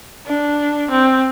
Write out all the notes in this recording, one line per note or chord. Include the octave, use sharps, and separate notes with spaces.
D4
C4